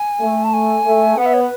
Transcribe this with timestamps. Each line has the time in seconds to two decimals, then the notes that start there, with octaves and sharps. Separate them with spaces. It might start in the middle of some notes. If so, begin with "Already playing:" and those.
Already playing: G#5
0.21 A3
0.44 A5
0.54 G#5
0.86 A3
1.17 B3 F#5
1.26 E5
1.34 C#5
1.41 B4